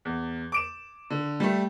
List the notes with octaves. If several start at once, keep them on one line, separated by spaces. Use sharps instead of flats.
E2
D6 D7 E7
D3
G3 A3